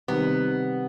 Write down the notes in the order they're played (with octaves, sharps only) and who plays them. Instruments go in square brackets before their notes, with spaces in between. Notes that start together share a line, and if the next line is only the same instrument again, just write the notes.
[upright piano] C3 D#3 G3 D#4 [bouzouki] B3